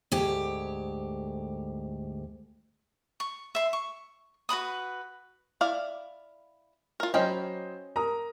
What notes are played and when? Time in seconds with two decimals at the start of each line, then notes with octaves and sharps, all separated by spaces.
0.12 D2 G#2 G4
3.20 C#6
3.55 E5 C6
3.73 C#6
4.49 F#4 B4 B5 D#6
5.61 E4 D5 F5
7.00 F4 A#4
7.14 F#3 C#4 C5 D#5 G5 B5
7.96 A#4 A#5 D#6